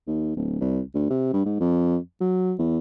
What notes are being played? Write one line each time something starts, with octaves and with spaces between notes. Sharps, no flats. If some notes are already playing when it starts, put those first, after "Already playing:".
D#2
D1
C2
D2
C3
G2
G#2
F2
F#3
E2